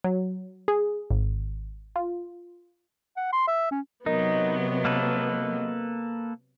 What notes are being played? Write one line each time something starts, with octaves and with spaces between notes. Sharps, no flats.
F#3
G#4
G#1
F4
F#5
C6
E5
C#4
C3 F#3 B3 D#4 A#4 D#5
A#3 A4 B4